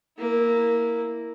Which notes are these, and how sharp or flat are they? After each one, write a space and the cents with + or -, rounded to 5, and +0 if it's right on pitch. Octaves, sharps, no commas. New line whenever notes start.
A#3 +0 E4 -10